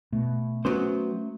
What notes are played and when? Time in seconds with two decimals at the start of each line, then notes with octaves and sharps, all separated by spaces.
0.13 B2 A3
0.65 F#3 B3 C#4 C5